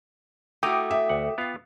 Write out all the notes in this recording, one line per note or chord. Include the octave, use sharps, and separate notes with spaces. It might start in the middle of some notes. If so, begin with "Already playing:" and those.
A3 E4 F#4 G5 A#5 D6 D#6
E5
D2 F#5
B3 F4 F5